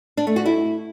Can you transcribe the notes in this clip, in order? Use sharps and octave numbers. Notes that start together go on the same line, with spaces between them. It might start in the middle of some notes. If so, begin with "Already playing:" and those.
D4
A3
F#4
E4